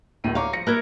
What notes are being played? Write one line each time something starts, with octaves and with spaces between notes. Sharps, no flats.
D1 A2 D#7
C#5 F5 A#5 C#6 D6
F3 A#6 C#7
A#3 E4 A#4 F6 F#6 G#6